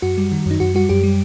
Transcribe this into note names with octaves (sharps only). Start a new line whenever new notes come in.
F#2 F#4
G3
D#3
F#2 D#4
F#2 F#4
G3 F#4
F#2 G4
G3